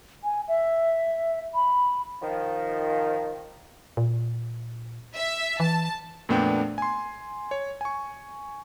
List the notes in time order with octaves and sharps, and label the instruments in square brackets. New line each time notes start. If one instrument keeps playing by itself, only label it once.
[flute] G#5
E5
B5
[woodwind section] D#3 F3
[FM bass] A#2
[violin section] E5
[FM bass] E3 [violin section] A5
[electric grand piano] F2 A#2 A3 B3 D4 G5
G#5 C6
C#5
G#5 C#6